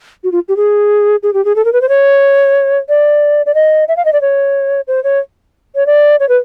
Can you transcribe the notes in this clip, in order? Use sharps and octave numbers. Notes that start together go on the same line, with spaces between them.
F#4
F4
G4
G#4
G#4
G4
G#4
A4
A#4
B4
C5
C#5
D5
D5
D#5
E5
F5
D#5
D5
C#5
C5
C#5
C#5
D5
C#5
B4